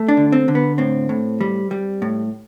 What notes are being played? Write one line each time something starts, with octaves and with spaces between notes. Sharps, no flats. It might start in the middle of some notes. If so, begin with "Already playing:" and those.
Already playing: A3
D4
D3
C4
D3
B3
A2 C4
A2
G3
G3
A2